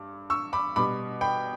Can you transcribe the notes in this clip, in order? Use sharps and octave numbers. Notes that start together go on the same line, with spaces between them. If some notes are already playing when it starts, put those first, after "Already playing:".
Already playing: G2 D6
C#6 E6
B5 D6
B2 G3 B5 D6
G5 B5